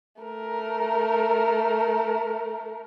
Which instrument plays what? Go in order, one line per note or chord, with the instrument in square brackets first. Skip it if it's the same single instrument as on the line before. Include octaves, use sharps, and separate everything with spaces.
[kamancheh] A3 A#4